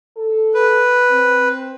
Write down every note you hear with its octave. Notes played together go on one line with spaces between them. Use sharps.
A4
B4
C4